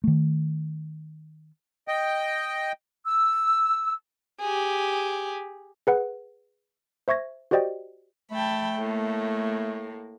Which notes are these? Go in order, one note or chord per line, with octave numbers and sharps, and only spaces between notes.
D#3 A3
D#5 G5
E6
G4 G#4
G#4 B4 F#5
C5 E5 C#6 G#6 A#6
F#4 G4 C5 D5 D#5 G5
A3 G5 A5 B5
A2 A#3